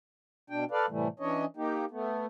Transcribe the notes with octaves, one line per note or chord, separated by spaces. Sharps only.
B2 D4 G5
A4 B4 D5 F5
A2 C3 E3 G3 A3
E3 C#4 D4 C#5 D#5
A#3 D#4 G4
A3 B3